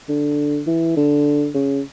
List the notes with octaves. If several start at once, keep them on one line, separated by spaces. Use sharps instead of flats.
D3
E3
D3
C#3